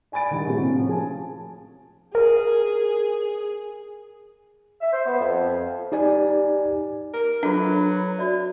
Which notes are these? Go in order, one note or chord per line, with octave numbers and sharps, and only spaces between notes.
D5 G#5 B5 A6 D7
D3 D#3 G3 D#4
A2 C3 G#3 A#3 C4 F#4
F3 C#4
G#4 G#5 A5
G#4 A#4
E5
C5
B3
F2
D#4 G4 D5 G#5
A#4
F#3 D4 F4 G#4 A4 B4
F#4 D5 E5